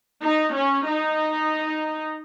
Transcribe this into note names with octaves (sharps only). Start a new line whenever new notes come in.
D#4
C#4
D#4